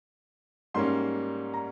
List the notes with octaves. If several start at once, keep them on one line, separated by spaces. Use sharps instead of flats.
G#2 G3 A#3 C#4 C6
A#5